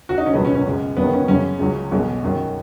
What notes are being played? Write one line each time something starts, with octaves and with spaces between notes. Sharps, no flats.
F#4
D#4
C#4
C#2 B2 F#3 B3
C#4
C#4
F#2 C#3 G#3
F#1 F#2 D#3 B3
C#4
F#1 F#2 C#3 F#3 C#4
C#2 C#3 F#3
B1 B2 G#3
F#2 D#3 F#3